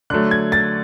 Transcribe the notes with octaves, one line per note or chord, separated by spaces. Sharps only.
D3 F#3 A3 F#6
G#6
A6